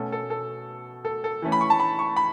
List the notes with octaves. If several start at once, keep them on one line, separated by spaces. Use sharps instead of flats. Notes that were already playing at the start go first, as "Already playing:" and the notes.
Already playing: B2 A3 C#4 A4
A4
A4
A4
A4
E3 A3 C#4
B5
C#6
A5
B5
C#6
B5